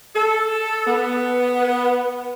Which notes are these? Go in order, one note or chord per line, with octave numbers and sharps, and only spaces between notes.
A4
B3